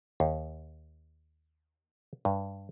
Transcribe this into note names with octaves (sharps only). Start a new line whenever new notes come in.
D#2
G2